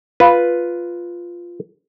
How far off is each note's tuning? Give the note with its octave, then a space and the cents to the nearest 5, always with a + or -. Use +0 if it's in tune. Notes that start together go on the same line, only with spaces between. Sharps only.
F4 +0 B4 +0